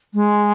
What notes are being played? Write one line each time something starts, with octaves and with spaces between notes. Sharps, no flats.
G#3